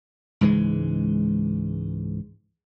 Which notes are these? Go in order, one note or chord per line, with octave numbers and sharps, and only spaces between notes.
C#2 G#2 E3 G#3